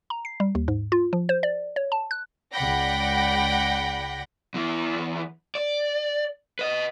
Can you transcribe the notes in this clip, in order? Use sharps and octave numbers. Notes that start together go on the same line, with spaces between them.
A#5
C7
G3
D#2
G#2
F4
F3
C5
D5
C#5
A5
F#6
C#2 D5 F#5 G5 B5 A#6
E2 E3
D5
B4 D#5